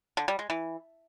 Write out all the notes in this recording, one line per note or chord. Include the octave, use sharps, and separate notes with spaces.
D3
G3
G#3
E3